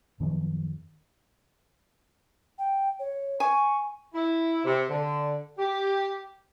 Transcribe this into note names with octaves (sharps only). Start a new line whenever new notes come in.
F#2 D#3 F3 B3
G5
C#5
G#5 C#6
E4
C3
D3
G4